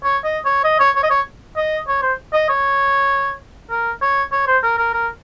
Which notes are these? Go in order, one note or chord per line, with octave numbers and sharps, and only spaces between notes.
C#5
D#5
C#5
D#5
C#5
C#5
D#5
C#5
D#5
C#5
C5
D#5
C#5
A#4
C#5
C#5
C5
A#4
A#4
A#4